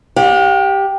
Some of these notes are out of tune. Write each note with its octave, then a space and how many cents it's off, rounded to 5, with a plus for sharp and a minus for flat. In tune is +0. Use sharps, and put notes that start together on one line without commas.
G4 +0 F5 +45